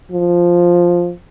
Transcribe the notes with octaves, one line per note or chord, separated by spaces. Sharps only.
F3